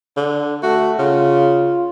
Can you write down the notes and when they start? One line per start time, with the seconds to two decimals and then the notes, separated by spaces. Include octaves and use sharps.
0.17 D3
0.63 A3 F#4
0.99 C#3 F4